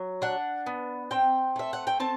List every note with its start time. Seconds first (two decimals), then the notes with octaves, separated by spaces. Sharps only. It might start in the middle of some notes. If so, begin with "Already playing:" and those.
Already playing: F#3
0.22 D4 F#5
0.66 B3
1.11 C4 G5
1.56 A3 E5
1.73 F#5
1.87 G5
2.00 C4 A5